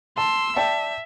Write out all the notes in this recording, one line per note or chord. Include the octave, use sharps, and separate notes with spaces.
A5 C6 E6
D5 E5 G5 A5